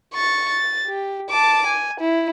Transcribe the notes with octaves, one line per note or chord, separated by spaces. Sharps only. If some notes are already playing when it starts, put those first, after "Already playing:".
C#6 A6
A6
G4
A5 D6
G#5
E4